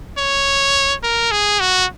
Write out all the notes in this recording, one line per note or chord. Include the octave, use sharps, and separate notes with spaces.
C#5
A#4
G#4
F#4